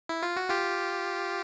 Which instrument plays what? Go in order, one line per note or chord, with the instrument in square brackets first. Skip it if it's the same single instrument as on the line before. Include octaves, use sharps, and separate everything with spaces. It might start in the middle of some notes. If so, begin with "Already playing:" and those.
[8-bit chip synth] E4
F4
F#4
F4 G4